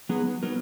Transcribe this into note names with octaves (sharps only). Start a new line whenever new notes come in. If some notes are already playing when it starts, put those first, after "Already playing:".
F#3 B3 D#4 G#4
F#3 B3 D#4 A#4